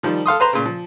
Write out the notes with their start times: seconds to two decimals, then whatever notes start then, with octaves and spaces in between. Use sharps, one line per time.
0.03 D#3 F3 G3
0.26 A4 F5 C6 D#6
0.40 B4 C5 A#5 C6
0.53 A#2 C#3
0.66 F3